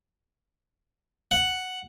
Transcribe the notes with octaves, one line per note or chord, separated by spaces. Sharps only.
F#5